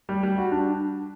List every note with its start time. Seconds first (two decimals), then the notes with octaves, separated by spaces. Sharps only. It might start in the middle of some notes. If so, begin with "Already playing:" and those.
0.09 G3
0.23 G3
0.38 F#4
0.52 D4